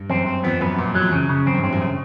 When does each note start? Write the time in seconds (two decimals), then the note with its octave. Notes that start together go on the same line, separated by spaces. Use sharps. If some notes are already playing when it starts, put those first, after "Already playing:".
Already playing: G2
0.10 F#2 C4
0.27 C4
0.44 F2 B3
0.61 F#2 B3
0.78 F2 A#2
0.95 F#2 F#3
1.03 F2
1.11 F#2 C#3
1.29 C#3
1.46 F#2 C4
1.55 G2
1.64 A2 C4
1.73 F#2
1.81 C#3